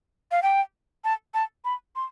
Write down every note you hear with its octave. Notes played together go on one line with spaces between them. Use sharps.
F5
G5
A5
A5
B5
C6